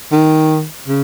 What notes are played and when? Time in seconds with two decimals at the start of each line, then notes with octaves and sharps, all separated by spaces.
0.12 D#3
0.88 C#3